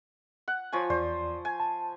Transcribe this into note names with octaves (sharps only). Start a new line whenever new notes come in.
F#5
F3 C#5 G#5
E2 C5 D5
G#5
A5